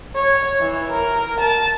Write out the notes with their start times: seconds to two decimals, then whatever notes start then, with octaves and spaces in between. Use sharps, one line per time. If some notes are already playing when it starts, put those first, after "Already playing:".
0.16 C#5
0.60 E3
0.91 A#4
1.40 A5